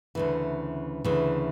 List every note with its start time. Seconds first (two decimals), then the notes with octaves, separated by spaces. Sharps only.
0.15 D2 C#3 E3
1.04 D2 C#3 E3